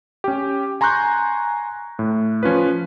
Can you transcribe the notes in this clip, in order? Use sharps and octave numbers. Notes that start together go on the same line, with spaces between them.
C#4 G4
G#5 A#5 C6 C#6 F#6 G6
A2
F3 C#4 F4 B4